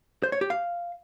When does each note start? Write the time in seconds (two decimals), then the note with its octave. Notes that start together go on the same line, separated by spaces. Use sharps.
0.23 C5
0.32 C#5
0.41 G4
0.50 F5